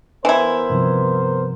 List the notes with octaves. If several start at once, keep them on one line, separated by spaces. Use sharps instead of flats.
E3 B3 E4 A#4 C5
G2 C3 F3